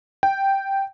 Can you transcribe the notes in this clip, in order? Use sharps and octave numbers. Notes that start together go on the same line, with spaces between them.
G5